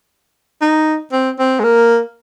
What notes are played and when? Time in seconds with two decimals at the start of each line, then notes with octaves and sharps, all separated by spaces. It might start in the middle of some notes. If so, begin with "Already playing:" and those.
0.61 D#4
1.12 C4
1.39 C4
1.60 G#3
1.64 A#3